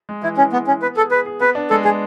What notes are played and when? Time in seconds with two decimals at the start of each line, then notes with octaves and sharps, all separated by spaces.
0.09 G#3
0.23 E3 E4
0.38 E3 C#4
0.53 G#3 B3
0.67 E3 C#4
0.82 B3 B4
0.96 G#4 A4
1.11 G#4 B4
1.26 G#4
1.41 B3 B4
1.55 D4
1.70 G#3 A4
1.85 G#3 G#4